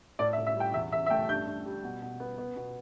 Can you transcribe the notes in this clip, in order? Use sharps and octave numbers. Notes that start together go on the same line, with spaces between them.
A2 D5
E5
A2
E5
G3
G5
E2 E5
E2 E5
E5
A3 G5
G2 G6
G2
G3
B2
B2
B3
B3
B2